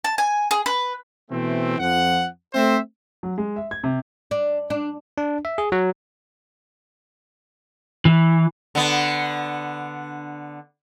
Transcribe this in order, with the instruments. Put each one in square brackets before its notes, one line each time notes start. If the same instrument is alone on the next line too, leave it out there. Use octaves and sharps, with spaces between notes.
[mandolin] A5
G#5
G#4
B4
[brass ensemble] B2 E3 A3 C4
F2 F3 F#5
A3 C4 C5 E5
[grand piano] F#3
G#3
E5
G#6
C3
[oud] D4
D4
[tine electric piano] D4
E5
G#4
F#3
[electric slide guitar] E3
[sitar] D3 B3